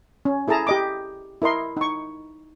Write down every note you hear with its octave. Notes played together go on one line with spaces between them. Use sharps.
C#4
E4 G#4 A4 A5 A#5
G4 D#5 D6
E4 A#4 D#5 C6
D#4 C#6